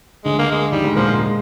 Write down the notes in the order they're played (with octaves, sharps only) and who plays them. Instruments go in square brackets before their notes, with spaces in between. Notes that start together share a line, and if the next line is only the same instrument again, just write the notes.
[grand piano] D2 D3 [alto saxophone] G#3
[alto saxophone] A#3
G#3
[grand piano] D#2 D#3 [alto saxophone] G3
[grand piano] G#2 G#3
[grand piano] A#2 A#3 [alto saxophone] F3
[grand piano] G#2 G#3
G#3